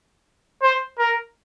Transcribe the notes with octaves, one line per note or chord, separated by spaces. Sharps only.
C5
A#4